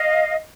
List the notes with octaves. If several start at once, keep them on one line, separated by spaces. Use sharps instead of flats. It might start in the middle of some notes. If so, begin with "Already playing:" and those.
Already playing: D#5 F5